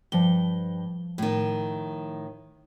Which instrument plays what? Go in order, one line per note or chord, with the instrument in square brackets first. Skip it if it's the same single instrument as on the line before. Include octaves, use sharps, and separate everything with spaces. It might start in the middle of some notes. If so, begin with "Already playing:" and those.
[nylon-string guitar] G2 [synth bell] F3 G7
[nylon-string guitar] A2 D#3